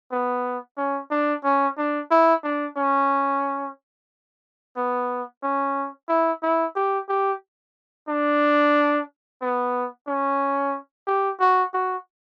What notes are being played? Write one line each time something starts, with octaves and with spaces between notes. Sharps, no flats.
B3
C#4
D4
C#4
D4
E4
D4
C#4
B3
C#4
E4
E4
G4
G4
D4
B3
C#4
G4
F#4
F#4